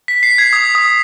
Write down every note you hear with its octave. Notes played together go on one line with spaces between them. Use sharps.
B6
C7
G#6
D#6
D#6